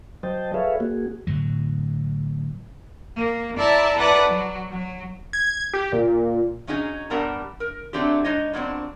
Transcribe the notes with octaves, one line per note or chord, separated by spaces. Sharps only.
F#3 C5 D#5 G5 A5
G#4 A4 B4 C#5 E5 F5
A#3 F#4 G#4
A2 D3 F#3
A#3
E4 A4 D5 E5 A5 A#5
E4 A4 B4 D5 F#5
F#3
F#3
G#6
G4
A#2
F#3 C#4 D#4 G4 G#4
G2 G3 B3 A#4 A5 A#5
A#4
F#3 A3 C4 D4 G4
G#3 D#4 C#5 D#5
A#2 F#3 B3 C4 D4